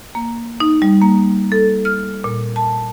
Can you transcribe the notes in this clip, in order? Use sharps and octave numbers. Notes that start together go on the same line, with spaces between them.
A#3
D#4
G3
A#3
A4
F6
A#2
A5